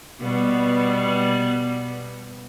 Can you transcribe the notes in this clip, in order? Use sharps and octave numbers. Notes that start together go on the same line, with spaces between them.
B2 G3 B3